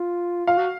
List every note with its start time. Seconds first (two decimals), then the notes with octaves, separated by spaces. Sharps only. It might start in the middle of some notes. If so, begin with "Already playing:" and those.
Already playing: F4
0.47 F4 F5
0.57 F#4